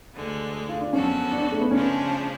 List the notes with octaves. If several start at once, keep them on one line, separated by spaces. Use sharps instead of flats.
D2 D3 G#3
F4
D4
F#2 F3 B3 C#4 F#4 A4
D4
D4
A3
B3
C#3 F3 G#3 C#4 D4